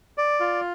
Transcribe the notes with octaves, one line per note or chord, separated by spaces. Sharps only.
D5
F4